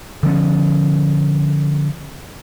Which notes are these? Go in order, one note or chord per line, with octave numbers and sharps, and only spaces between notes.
D3 F3 C4 C#4